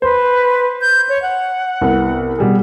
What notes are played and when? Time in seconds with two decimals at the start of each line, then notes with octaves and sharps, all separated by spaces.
0.02 B4 C5
0.81 G6
1.09 C#5
1.22 F#5
1.81 C2 B3
2.38 B2 G3 G#4